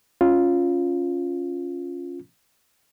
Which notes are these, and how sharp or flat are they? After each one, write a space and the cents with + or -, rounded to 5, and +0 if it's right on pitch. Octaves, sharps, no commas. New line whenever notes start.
C#4 +0 F4 +0